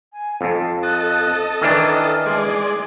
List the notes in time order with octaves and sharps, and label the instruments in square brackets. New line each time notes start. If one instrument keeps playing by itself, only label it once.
[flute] G#5
[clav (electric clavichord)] F2 [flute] A5
[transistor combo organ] A4 D#5 [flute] F#6
[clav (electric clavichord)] D#3 E3 D4 [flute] F6
[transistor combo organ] G#3 D5 [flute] C6